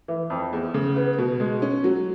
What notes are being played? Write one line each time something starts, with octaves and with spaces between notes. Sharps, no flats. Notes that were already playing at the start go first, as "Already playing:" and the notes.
E3
F2
E2
C#3
B3
B2
G#3
C#4
F#3